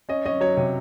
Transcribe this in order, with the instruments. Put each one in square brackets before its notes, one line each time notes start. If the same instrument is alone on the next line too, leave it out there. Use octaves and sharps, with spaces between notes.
[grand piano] C#4 D#5
C#4 D#5
F#3 C#5
C3 C#5